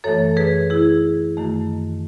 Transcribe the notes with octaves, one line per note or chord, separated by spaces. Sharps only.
F#2 E3 A3 A4 C#5
G#4 B4
E4 G#4
F#2 D#3 A3